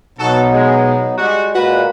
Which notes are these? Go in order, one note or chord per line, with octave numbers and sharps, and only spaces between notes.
B2 F#3 B3 D#4 F#4 A4
G#3
G3 G#3 F#4
A#2 G#3 A#3 F#4 B4